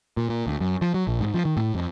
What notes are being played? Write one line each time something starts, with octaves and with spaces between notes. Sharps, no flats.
A#2
A#2
D2
F#2
F3
F#3
A#1
G#2
F3
D#3
A2
F2